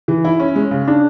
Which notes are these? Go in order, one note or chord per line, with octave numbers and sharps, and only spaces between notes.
E3
E4
C#4
G#3
C#3
D4